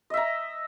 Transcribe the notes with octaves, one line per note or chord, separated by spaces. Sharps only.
D#5 E5 A#5